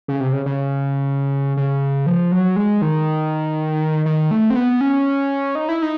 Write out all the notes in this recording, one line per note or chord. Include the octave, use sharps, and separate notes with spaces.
C#3
C3
C#3
C#3
C#3
F3
F#3
G#3
D#3
D#3
A3
C4
B3
C#4
D#4
E4
D#4